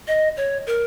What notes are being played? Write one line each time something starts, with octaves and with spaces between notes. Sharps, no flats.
D#5
C#5
A#4